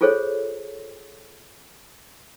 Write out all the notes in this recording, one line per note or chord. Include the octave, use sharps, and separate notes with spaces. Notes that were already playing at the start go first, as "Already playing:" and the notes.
F4 G#4 A4 C5 C#5